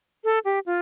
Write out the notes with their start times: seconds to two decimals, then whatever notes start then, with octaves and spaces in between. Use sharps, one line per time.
0.24 A4
0.45 G4
0.66 F4